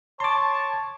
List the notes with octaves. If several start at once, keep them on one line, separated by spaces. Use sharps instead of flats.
C#5 A5 C6 D6